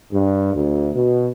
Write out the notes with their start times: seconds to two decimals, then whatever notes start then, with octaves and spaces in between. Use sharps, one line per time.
0.11 G2
0.54 D2
0.95 B2